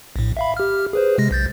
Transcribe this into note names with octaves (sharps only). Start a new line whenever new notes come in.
A#1 A2
E5 F5 B5
G4 F6
G#4 B4 C5
C3 G#3 A#6
B1 G6 A6